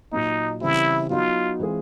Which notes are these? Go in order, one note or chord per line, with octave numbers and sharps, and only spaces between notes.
A#2 F#3 A#3 D#4
C#3 E3 G3 C4 E4
F#3 B3 D#4 F4 F#4
E3 G#3 C4 F4 G#4